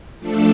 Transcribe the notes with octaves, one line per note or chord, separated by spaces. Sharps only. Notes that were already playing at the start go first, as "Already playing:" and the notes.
F3 A3 D4 A4